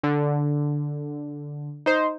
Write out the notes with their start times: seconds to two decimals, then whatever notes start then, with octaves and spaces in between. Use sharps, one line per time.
0.03 D3
1.86 D#4 C5